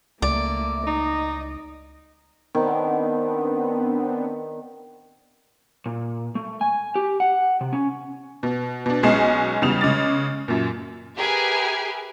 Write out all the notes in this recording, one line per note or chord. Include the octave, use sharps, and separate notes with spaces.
C#2 A3 A#3 D5
D#4 D#5
D#3 B3 C4 D4
A#2
A3
G#5
G4
F#5
C3
C#4
B2
B2 D4
B1 G#3 C#4 G#4 C7 E7
E2 C#3 G3 D#6 E7 F7
C#3 G#3 D6 A6
F#2 A#2
G4 G#4 A#4 B4 E5 G#5